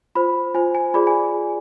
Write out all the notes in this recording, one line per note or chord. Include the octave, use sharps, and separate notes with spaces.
F4 C5 B5
F4 C5 G#5
G#5
F4 G#4 D5 B5
G#5